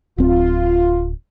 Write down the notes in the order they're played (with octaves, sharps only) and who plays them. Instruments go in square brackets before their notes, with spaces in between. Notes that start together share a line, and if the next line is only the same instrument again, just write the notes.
[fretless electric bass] D1 C4 [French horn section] F4